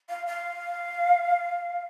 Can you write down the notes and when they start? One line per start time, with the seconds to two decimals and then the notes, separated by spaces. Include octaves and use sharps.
0.09 F5
0.27 F5